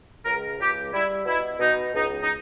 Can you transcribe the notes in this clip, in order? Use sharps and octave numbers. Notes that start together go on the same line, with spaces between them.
C#2 A#4
C#2 G4
G3 E4
B2 E4
B2 D#4
C#2 D#4
D#4